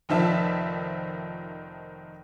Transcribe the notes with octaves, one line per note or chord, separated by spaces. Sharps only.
F1 D#3 F3 E5 A5